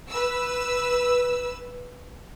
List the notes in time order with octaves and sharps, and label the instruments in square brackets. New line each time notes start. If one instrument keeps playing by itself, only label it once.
[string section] B4 E6